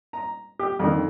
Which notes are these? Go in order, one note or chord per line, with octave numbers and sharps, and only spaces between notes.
A#5
G4
F2 D3 D#3